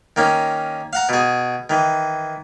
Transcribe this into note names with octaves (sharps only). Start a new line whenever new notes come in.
D#3 A#3 C#4
F5 F#5 A#5
B2 G#4
D#3 E3